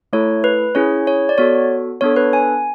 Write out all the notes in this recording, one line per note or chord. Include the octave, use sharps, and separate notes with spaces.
A3 E4 A4 C#5
B4
C#4 E4 G#4 C#5
C#5
D5
B3 F#4 A4 C#5
B3 D4 A4 C#5
B4
G#5